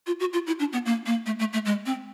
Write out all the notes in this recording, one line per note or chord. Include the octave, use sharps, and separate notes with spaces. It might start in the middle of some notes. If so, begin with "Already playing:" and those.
F4
F#4
F4
E4
D4
B3
A#3
A#3
A3
A3
A3
G#3
C4